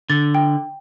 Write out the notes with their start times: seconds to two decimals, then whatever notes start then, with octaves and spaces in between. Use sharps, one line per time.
0.10 D3 A6
0.35 G5